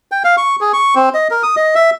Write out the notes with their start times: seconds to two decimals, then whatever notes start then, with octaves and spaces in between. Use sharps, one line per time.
0.12 G5
0.24 F5
0.37 C#6
0.61 G#4
0.73 C#6
0.95 C4
1.14 D#5
1.31 A#4
1.43 D#6
1.56 D#5
1.75 E5